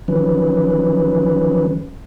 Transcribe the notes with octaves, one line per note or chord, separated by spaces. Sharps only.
D#3 F3 F#3 C#4 B4